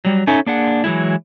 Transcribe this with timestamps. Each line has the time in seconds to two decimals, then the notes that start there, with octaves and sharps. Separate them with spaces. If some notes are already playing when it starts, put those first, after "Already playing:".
0.05 F#3 G3
0.27 C#4 D#4 A4 E5 G#5
0.47 A#3 D4 G#4 F#5
0.84 E3 F#3 G#3 E4